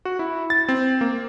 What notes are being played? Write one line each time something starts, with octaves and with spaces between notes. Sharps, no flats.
F#4
E4
A6
C4
A#3